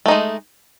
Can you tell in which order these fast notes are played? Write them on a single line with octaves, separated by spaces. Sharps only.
A3 D#4 G#3